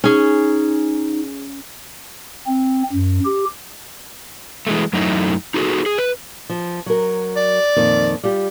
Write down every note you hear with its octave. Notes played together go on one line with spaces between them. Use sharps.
C#4 D#4 G#4
C4
F#2
G4
E3 G#3 A3
F#2 F#3 A3 D#4 E4
D#4 F#4 G#4 A4
G#4
B4
F3
F#3 A#4
D5
F2 A#2 D#3
G3 F4 G4